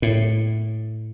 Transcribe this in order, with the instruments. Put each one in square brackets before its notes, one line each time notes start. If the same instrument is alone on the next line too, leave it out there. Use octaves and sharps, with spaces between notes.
[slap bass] A2